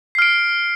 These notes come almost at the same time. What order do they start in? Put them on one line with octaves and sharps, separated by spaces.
C7 F6 D7